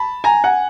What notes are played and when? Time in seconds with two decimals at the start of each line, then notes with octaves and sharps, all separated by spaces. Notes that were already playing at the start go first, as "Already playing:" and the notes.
Already playing: A5 B5
0.24 G#5 A#5
0.44 F#5 G#5